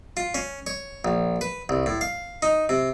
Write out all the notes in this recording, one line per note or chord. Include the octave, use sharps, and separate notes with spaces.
F4
C#4
C#5
A#1
B4
C2
A2
F5
D#4
C3